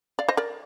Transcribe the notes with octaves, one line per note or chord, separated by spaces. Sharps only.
D5 F5
C5 D#5
A#4 D5